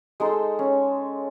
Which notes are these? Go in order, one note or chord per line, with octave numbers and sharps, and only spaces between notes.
G#3 D#4 A4 C5
C#4